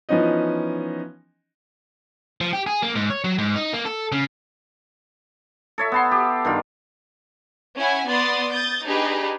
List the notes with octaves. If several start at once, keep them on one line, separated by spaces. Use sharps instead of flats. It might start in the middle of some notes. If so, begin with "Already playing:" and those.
E3 F3 B3 C#4 D#4 D#5
F3
G4
G#4
A#3
G#2
C#5
F#3
G#2
D#4
A#3
A4
C#3
A4 C#5 E5
B3 A5 C6
G4
G2 D#3 F4
C#4 E4 F#5 G#5
B3 D5 C6 D#6 A6
D#6 G6 A6
D4 D#4 G4 G#4 B4